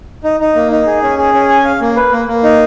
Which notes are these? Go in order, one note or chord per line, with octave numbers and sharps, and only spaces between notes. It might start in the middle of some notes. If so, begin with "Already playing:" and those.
D#4
D#4
A#3
D#4
G#4
C#4
G#4
C#4
G#5
F5
A#3
B4
A#3
A#3
D#4